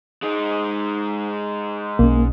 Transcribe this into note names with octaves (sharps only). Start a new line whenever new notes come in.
G#3 D#4
B1 A#3 C#4